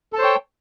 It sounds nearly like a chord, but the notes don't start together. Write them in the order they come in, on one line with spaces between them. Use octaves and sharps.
A4 A5 C5 C#5 G5